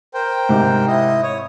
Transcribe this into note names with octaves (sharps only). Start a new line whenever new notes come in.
A#4 C5 G5
G#2 C3
E4 D#5
C#5 D#6